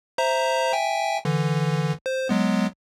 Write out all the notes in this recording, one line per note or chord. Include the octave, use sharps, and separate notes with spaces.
C5 E5 A#5
E5 G5 G#5
D3 E3
C5
F#3 G#3 B3